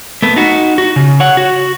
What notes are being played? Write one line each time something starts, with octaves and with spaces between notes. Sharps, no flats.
A3 B3
D#4 F#4
F#4
C#3
C#5 F#5
F#4